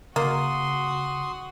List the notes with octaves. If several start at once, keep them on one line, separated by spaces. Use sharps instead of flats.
C#3 A#3 F#4 C6 D#6